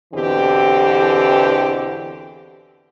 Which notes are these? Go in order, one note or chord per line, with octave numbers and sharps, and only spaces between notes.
E2 B2 D3 E3 C4 G4